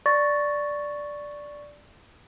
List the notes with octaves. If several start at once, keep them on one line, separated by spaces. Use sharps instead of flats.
D5 C#6 A6 A#6